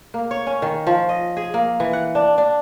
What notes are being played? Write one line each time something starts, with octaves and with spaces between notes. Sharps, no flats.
A#3
C#5
C#4
D#3
F3
D#5
G#4
A#3
E3
F#5
D4
D4